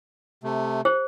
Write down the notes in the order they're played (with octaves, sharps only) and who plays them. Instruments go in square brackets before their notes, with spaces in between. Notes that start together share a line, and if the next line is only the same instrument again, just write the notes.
[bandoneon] C3 A3
[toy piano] G4 C5